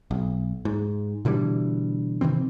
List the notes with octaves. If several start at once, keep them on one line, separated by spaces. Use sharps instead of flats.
B1
G#2
B2 D3 E3 G3
C3 D#3 E3 C4